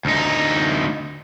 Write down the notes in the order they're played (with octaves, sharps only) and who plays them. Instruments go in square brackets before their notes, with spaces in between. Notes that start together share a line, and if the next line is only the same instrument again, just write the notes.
[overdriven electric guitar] D2 D#4